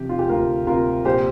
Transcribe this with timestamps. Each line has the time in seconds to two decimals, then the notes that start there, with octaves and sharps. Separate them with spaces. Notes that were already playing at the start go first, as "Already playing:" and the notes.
Already playing: C3 F3 G4
0.09 F4
0.19 G4
0.29 D2 F4 A#4
0.67 C3 F4 A#4
1.05 A#1 G4 C5